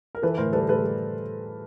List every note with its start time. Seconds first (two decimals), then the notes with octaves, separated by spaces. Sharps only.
0.15 A#4
0.22 E3 A4 B4
0.38 A2 A#4 C5
0.53 G3 A4 B4
0.68 A2 A4 B4
0.84 G3